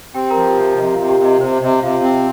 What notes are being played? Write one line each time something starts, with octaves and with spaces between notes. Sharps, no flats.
C4 G4 G5
A#4 A#5
F3
G4 G5
C3
C3 D#5
C3 F4 F5
G4 G5
C3
D#5
C3 C5
C3 D#5
C3 F4 F5
C4